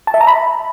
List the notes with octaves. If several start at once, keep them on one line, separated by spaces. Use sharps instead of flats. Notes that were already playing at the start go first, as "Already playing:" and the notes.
A5
E5
A#5
B5